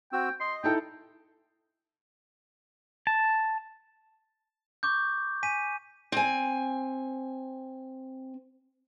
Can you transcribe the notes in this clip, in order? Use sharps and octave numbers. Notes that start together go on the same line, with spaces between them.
C4 F#4 G5 E6
D#5 C6
D#4 E4 A4 G5
A5
C#6 D6 G6
G#5 B6 D#7
C4 G#5